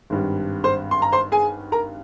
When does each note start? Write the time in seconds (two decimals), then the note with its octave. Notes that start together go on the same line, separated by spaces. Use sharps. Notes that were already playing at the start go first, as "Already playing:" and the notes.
0.10 G#1 G2 G3
0.64 C5 C6
0.91 C6
1.02 A#5
1.12 C5 C6
1.32 G#4 G#5
1.72 A#4 A#5